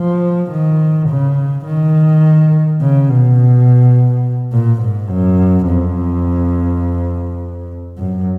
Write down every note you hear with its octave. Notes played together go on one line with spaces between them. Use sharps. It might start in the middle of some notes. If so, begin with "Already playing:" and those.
Already playing: F3
D#3
C#3
D#3
C#3
B2
A#2
G#2
F#2
F2
F#2